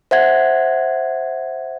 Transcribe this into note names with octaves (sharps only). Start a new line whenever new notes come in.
C5 E5 F#5 G#6